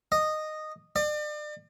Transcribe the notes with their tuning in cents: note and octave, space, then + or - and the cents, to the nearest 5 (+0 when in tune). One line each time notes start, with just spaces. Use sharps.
D#5 -10
D5 +40